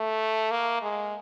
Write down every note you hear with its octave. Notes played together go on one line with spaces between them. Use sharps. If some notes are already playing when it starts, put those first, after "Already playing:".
Already playing: A3
A#3
G#3